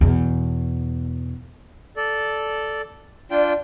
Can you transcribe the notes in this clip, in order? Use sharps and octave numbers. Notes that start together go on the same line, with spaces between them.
E2 B2
A4 D5
D4 F4 D5 G5